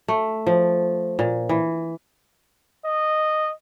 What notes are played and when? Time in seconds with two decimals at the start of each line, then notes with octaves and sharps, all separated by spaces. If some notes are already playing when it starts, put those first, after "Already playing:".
0.08 A3
0.47 F3
1.19 A#2
1.49 E3
2.85 D#5